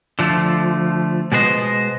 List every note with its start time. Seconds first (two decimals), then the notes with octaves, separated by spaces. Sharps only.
0.19 D3 F3 A3
1.32 B2 G#3 B3 C5 D#5